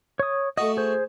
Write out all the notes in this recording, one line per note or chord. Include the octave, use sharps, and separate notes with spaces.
C#5 D#6
A3 F#4 D#5
G#4 C5